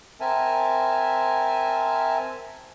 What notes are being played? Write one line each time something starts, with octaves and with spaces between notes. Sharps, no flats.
C4 A#4 E5 G#5 A5